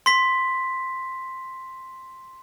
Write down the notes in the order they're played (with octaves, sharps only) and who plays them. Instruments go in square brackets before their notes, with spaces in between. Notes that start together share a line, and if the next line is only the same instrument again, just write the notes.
[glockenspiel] C6 B6